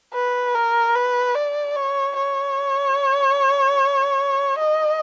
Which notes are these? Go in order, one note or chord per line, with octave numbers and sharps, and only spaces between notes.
B4
A#4
B4
D5
C#5
C#5
D#5